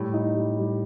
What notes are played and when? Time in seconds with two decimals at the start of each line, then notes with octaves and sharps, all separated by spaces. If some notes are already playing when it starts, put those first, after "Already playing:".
Already playing: A2 G3
0.14 D#4
0.35 G3
0.57 G3